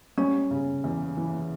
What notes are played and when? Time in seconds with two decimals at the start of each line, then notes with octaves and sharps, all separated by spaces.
0.18 G3 C#4
0.51 C#3
0.84 E2
1.17 E3